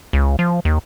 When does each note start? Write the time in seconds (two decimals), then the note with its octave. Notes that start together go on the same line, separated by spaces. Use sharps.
0.13 C#2
0.39 F3
0.65 D#2